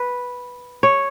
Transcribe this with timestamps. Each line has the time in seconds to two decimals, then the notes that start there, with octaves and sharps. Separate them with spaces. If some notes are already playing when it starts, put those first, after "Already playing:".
Already playing: B4
0.83 C#5